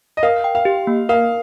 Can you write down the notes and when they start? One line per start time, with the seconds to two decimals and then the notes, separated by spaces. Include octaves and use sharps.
0.17 D#5
0.23 A#4 F5
0.44 G5
0.55 F5
0.65 G4
0.87 A#3
1.09 A#4 F5